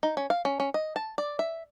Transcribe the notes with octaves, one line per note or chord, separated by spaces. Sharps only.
D#4
C#4
F5
C#4
C#4
D#5
A5
D5
E5